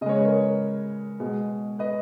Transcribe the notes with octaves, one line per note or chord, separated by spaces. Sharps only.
C#3 G#3 C#5 D#5
B4
A#4 C#5
B2 G#3
B4 D#5